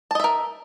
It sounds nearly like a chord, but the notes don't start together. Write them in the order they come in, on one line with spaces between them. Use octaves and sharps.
A5 D#5 E5 A#4